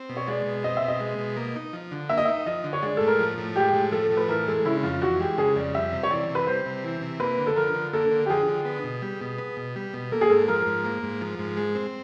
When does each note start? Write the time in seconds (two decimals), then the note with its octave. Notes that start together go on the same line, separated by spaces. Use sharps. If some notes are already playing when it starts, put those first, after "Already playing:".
Already playing: C4
0.09 B2
0.17 C#5
0.28 G#3 D5
0.46 B2
0.64 C4 D#5
0.77 E5
0.82 B2
0.88 D#5
1.00 G#3
1.18 B2
1.37 A#3
1.56 D#4
1.73 F3
1.91 D3
2.09 A#3 E5
2.17 D#5
2.25 D#4 E5
2.46 F3 D#5
2.64 D3
2.73 C#5
2.83 G#3 D5
2.97 A2 A4
3.08 A#4
3.20 F3
3.38 A2
3.56 G#3 G4
3.74 A2
3.92 F3 A4
4.11 A2
4.17 B4
4.28 E3 A#4
4.47 G#3 A4
4.65 C#3 E4
4.77 E4
4.83 F2 F4
5.01 E3 F#4
5.20 G#3 G4
5.38 C#3 G#4
5.56 F2 D5
5.75 G3 E5
5.92 C3
6.03 C#5
6.11 E3 D5
6.30 C3
6.35 B4
6.47 G3 C5
6.66 C3
6.84 E3
7.01 C3
7.20 A#3 B4
7.38 D3
7.47 A4
7.56 F3 A#4
7.74 D3
7.93 A#3 A4
8.11 D3
8.26 G4
8.29 F3 G#4
8.48 D3
8.65 B3
8.84 B2
9.02 G3
9.21 B2
9.38 B3
9.57 B2
9.76 G3
9.93 B2
10.12 A#3 A4
10.21 G#4
10.30 G#2 A4
10.48 F3 A#4
10.66 G#2
10.84 A#3
11.03 G#2
11.21 F3
11.39 G#2
11.57 G#3
11.75 C4